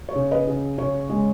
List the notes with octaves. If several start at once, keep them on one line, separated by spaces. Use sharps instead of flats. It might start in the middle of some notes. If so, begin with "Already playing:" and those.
C#5
C#3
B4 D#5
C#3
C#3 C#5
G#3